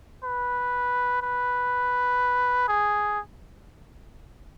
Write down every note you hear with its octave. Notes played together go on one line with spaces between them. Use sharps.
B4
B4
G#4